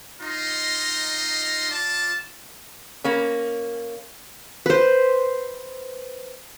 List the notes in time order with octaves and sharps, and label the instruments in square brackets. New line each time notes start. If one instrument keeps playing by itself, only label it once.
[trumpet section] D#4 F4 D#5 A#5 C6
F4 D5 A5
[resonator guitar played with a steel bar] A#3 C#4
[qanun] B4 C5